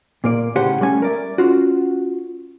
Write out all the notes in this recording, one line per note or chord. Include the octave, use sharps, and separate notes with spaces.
A#2 A#3 D5
A2 C#3 G4 C5 C#5 F#5
G3 A3 C#4 G#5
A#4 D5 E5
C#4 F4 F#4